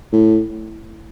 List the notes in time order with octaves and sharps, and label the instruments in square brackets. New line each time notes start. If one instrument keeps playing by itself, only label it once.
[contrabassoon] A2